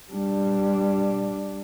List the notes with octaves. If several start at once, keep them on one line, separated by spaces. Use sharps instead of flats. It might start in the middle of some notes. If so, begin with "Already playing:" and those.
G3 D4